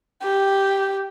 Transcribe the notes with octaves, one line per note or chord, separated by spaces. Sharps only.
G4